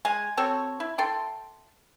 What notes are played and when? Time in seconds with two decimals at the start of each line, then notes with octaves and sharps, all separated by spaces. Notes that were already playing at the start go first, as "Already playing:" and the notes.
0.05 G#3 G#5
0.37 C4 F#4 A4 C#5
0.80 E4
0.98 A4 G5 C6